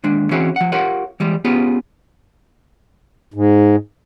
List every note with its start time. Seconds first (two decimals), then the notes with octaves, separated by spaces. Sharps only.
0.04 D#2 G#3 D4
0.31 E3 C4 C#4 E4 F#4 G#4
0.56 F3 F#5
0.72 F4 G4 A#4 C#5 F5 F#5
1.20 E3 G3 G#3
1.45 B3 C#4 F4 G4 G#4
3.34 G#2